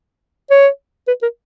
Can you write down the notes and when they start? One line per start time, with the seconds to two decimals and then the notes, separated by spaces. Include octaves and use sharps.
0.50 C#5
1.08 B4
1.23 A#4